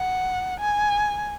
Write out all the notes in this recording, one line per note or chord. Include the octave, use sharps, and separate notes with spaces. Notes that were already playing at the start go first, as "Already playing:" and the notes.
Already playing: F#5
G#5